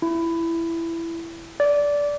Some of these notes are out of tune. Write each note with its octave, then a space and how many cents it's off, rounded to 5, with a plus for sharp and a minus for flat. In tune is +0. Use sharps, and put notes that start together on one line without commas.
E4 +15
D5 -15